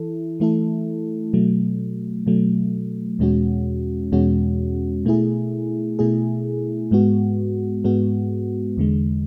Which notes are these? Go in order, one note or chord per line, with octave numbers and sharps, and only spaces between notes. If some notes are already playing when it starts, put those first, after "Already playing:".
Already playing: E3 E4 A4
E3 A3 E4 A4
B2 F#3 A3
B2 F#3 A3
E2 B2 G#3 C#4 F#4
E2 B2 G#3 C#4 F#4
B2 A3 E4 G#4
B2 A3 E4 G#4
G#2 G#3 B3 F#4
G#2 G#3 B3 F#4
E2 D3 G#3